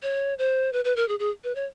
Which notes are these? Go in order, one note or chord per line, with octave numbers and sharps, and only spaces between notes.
C#5
C5
B4
B4
A#4
G#4
G#4
B4
C#5